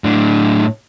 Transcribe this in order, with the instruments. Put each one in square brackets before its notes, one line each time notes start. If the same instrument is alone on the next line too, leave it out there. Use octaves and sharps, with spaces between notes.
[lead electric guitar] A2 D4